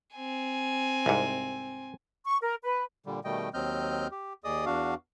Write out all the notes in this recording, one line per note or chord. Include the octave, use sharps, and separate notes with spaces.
C4 G#5
C2 G#2
C#6
A#4
B4
A#2 D3 G3
B2 D#3 G3 A3 D#5 G5
D#2 F#3 C4 D#5 F6 G6
G4
D#2 G#4 D5 D#5 D#6
E2 D4 F#4 F5